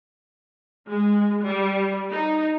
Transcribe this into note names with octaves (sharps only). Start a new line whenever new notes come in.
G#3
G3
D#4